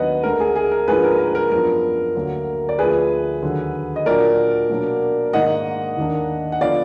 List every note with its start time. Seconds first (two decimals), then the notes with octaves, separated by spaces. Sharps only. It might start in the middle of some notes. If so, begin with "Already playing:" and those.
Already playing: D#2 D#3 F#3 B3 D4 B4 D#5 F#5
0.23 D2 D3 G#3 D4 A#4
0.40 G#4
0.56 G#4
0.72 A#4
0.88 G#2 F3 A#3 D4 G#4 B4
1.04 A#4
1.19 A#4
1.35 A#4
1.51 F#2 F3 B3 D4 A#4
2.15 D2 D3 F#3 A#3
2.69 D5
2.79 D2 D3 F3 G#4 B4
3.42 D#2 D3 F#3
3.96 D#5
4.06 A#2 F#3 D4 A#4 D5
4.69 B2 F#3 A#3 D4
5.33 G#2 D#3 A#3 D4 D#5 F#5
5.97 D#2 D#3 A#3 D4
6.52 F#5
6.61 D3 F3 B3 D5 F5